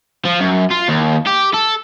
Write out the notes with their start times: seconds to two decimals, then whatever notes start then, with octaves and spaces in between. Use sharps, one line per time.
0.25 F3
0.40 F#2
0.70 F4
0.88 D#2
1.26 G4
1.54 A4